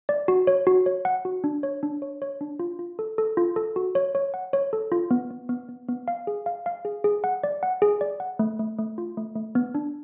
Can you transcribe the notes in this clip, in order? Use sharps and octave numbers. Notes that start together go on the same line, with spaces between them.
D5
F#4
C#5
F#4
C#5
F#5
F#4
D4
C#5
D4
C#5
C#5
D4
F4
F4
A4
A4
F4
A4
F#4
C#5
C#5
F#5
C#5
A4
F4
B3
B3
B3
B3
B3
F5
G#4
F5
F5
G#4
G#4
F#5
D5
F#5
G#4
D5
F#5
A3
A3
A3
F4
A3
A3
B3
D4